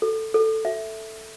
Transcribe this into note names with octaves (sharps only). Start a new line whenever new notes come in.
A4
A4
E5